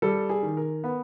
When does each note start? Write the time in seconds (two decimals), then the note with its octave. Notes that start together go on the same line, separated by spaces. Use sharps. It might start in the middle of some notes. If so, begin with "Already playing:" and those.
0.02 G3 A4
0.29 G#4
0.43 D#3
0.57 A#4
0.84 B3